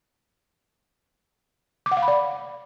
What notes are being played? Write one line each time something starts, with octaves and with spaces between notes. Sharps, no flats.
D6
F#5
F5
B5
D5